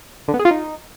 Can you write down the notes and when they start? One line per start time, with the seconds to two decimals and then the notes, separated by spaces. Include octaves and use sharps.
0.28 D3
0.34 B3
0.39 G#4
0.45 F4
0.51 D#4